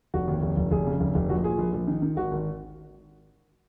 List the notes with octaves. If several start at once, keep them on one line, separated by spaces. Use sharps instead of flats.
F1 F#4
D#2
F1
F1
F1 G#4
C#3
F1
F1
A#1 F#4
A#2 G#4
A#1
A#1
D#3
D#3
G#1 F#4
G#1